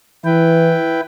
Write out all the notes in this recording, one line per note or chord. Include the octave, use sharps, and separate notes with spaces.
E3 E4 B4 G5